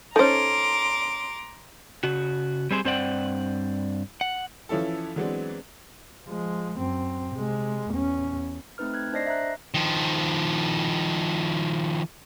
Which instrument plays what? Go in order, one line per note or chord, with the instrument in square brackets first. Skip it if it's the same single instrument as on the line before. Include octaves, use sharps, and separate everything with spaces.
[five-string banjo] C#4 A4 [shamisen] D#4 C5 [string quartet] A#5 C6 D6
[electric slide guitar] C#3 F#4
G3 C4 G#4 C5
G2 C4 C5 D5 F#5 G5
F#5
[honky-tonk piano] E3 F3 C#4 E4 A4
E3 F#3 G#3 B3 C4 D4
[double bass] F3 G#3
F#2 C4
C3 G#3
E2 C#4
[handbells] A3 C4 D#4 B4 F6
F#6 G#6
D4 C5 D5 D#5 A#6 C7
E5 A#5 F#6
[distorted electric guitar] D#3 F3